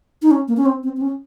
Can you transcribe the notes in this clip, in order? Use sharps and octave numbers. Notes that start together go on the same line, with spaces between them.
D#4
C#4
A#3
C#4
C4
C4
C4
C#4